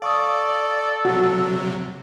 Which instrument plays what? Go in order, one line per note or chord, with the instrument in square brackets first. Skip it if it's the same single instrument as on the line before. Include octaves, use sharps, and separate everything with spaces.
[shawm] A4 [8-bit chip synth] D5 [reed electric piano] F5 C#6 D#6
[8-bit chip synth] C3 F#3 [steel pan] F#4